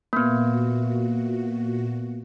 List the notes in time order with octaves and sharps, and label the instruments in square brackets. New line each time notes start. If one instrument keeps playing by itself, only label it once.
[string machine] A#2 F#4 [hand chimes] A#3 B3